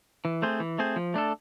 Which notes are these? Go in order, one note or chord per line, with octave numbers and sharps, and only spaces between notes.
E3
A3 C4 G#4 C5
E3
A3 C4 G#4 C5
F3
A3 D4 A4